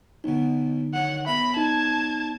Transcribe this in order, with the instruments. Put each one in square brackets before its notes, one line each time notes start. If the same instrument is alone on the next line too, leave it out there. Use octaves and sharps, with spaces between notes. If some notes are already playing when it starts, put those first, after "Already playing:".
[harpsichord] B1 B2 [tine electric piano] D3 D#4
[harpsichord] D#3 F#3 D4 [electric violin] F#5
[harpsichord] B1 A#4 A#5 [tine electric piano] E5 [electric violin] B5
[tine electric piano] D#4 [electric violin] A5 G#6